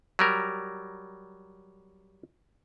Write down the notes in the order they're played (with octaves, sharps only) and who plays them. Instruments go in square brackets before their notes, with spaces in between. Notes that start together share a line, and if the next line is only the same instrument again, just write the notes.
[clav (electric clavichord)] F#3 G3 A#4